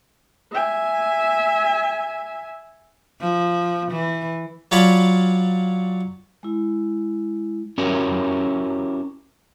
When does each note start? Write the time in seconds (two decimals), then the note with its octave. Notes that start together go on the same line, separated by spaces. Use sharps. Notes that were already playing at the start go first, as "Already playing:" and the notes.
0.53 E5 G#5
3.21 F3
3.91 E3
4.71 F#3 F4 C#5 D5 A5 B5
6.43 G#3 E4
7.78 C#4 E4 F#4 G4 A#4 C#5